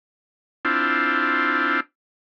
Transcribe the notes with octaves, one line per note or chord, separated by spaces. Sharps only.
C4 D4 E4 F4